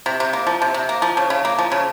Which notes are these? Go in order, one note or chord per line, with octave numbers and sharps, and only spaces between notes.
C3
C3
A#3
F3
C3
C3
A#3
F3
C#3
C#3
A#3
F3
C#3